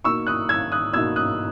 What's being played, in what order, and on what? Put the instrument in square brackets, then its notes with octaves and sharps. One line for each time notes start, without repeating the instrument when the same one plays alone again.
[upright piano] B2 A#3 D#4 C#6 E6
D#6 F#6
E6 G#6
D#6 F#6
B2 A#3 D#4 E6 G#6
D#6 F#6